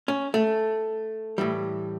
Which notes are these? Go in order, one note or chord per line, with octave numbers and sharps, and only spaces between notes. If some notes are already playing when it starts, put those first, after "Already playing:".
C#4
A3
A2 E3 G3